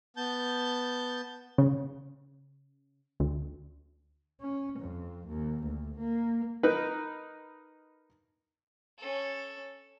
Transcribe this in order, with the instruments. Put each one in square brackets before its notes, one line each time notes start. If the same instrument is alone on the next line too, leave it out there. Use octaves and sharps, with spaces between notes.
[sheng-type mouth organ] B3 A5 G6
[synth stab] C#3
D2
[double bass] C#4
F2
D#2
D2
A#3
[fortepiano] D#4 A#4 B4
[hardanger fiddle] C#4 A4